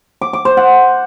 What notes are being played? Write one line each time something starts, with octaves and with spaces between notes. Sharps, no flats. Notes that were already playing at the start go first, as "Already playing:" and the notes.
D6
D6
C5
F#5